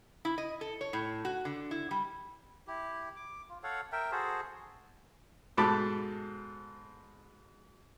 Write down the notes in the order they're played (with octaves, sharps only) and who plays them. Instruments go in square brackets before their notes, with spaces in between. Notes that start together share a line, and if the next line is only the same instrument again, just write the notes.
[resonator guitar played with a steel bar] E4
D#5
A4
C#5
A2
F#4
D3
E4
G3
[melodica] E4 G4
D6
F4
A4 C#5 F5 F#5
A#4 E5 G5
F#4 G#4 A4 C5
[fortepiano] G#2 B2 A4 A5 B5 D6